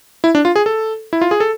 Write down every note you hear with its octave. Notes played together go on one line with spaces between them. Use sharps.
E4
D4
F4
G#4
A4
E4
F4
G#4
A4